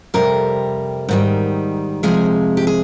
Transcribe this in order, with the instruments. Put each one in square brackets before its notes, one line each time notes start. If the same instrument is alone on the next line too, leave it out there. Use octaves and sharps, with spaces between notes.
[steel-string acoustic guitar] F2 C3 G3 A#4
G#2 D#3 G3
F2 C3 F3 G#3 G#4
G4
G#4